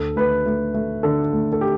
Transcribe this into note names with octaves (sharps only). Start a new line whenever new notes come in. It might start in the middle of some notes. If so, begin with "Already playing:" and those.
Already playing: D2 A4
A3 B4
A3
A3
D3 A4
A3
A4
G4